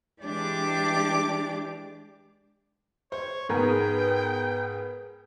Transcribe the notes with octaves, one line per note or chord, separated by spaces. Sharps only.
E3 G#3 D4 G4 D5 D6
C5 C#5
G#2 B3 G#4 A#4 G5